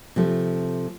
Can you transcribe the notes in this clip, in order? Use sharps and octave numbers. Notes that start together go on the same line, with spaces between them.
C3 F3 A3